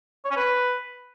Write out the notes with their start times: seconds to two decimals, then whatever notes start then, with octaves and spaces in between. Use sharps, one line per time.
0.25 C#5
0.31 C#4
0.36 B4